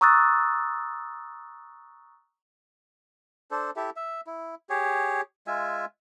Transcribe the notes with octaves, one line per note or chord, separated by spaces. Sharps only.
A#5 C#6 D#6 E6 F#6 A6
D4 A4 C5
E4 G4 A4 E5
E5
E4
G4 G#4 C#5
G#3 F4 E5 G#5